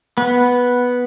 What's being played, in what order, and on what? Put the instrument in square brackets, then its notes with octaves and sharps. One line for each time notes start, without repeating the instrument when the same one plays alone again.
[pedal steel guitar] B3